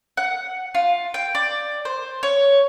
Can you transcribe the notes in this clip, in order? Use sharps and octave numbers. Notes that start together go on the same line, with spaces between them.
F#5
F4
G5
D5
C5
C#5